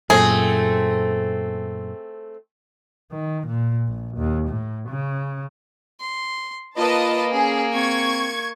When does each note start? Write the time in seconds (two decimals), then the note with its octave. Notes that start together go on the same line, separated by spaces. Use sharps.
0.10 F#2 A#2 A3 C4 G#4
3.13 D#3
3.47 A#2
3.87 A#1
4.17 D#2
4.48 A2
4.89 C#3
6.00 C6
6.78 A#3 F4 B4 D#5 A5
7.34 C#4 G#4
7.75 C4 C#6 G#6